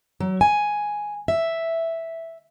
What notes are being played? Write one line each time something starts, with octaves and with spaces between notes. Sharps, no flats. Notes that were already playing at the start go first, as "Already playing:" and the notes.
F#3
G#5
E5